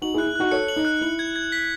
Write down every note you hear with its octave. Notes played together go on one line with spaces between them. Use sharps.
D#4 F#4 F#7
E4 G#4 F#6
E4
D#4 F#4 F#6
A4 C#5 C#7
F#7
D#4
F#6
E4 F#7
G#6
G#6
B6